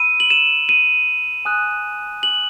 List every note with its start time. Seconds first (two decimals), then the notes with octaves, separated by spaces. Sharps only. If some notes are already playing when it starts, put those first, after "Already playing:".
Already playing: B5 E6 D#7
0.20 F#7
0.30 E7
0.69 D#7
1.45 G#5 D#6 F#6
2.23 F#7